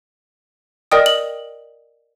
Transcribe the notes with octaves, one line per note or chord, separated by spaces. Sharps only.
A#4 D5 D#5 G5 D#6
F#7